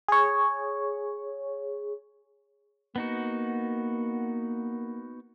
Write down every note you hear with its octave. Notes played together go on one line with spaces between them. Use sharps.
G#4 C#5
A#3 B3 D#4 F#4